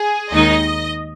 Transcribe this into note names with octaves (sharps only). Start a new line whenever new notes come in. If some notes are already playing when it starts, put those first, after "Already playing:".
Already playing: G#4
D#2 D#3 G#3 D#4 D#5